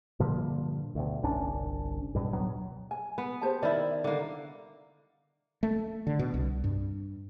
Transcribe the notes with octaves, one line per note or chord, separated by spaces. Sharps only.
G2 A#2 D3 F3
D2 B2
G1 C2 C#4 D4
G2 B2
D1 B2 F#3 B3
G#5
B3
G4 C5 A5
D#3 E4 D5
D3 A#3
A3
D3
B2
C2
G2